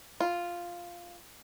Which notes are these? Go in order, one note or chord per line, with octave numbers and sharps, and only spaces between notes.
F4